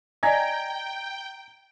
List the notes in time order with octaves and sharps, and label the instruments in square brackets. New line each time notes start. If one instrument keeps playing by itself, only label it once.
[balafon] D5 D#5 G#5 [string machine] G5 [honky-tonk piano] A#5 G#6 A#6